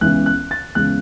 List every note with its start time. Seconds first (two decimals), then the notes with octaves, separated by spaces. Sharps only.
0.01 C#2 C#3 E3 B3 F#6
0.26 F#6
0.51 A6
0.75 C#2 C#3 E3 B3 F#6